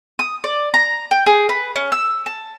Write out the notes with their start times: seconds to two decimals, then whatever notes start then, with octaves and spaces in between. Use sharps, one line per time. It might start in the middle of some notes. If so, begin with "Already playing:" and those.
0.19 D#6
0.44 D5
0.74 A#5
1.11 G5
1.26 G#4
1.49 B4
1.76 C#4
1.92 E6
2.26 A5